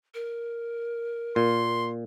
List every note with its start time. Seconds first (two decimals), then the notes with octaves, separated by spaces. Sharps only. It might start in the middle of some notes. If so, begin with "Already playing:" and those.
0.14 A#4
1.36 A#2 C6